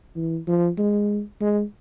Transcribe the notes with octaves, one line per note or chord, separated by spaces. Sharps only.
E3
F3
G#3
G#3